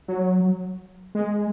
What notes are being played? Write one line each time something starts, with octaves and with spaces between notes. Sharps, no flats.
F#3
G#3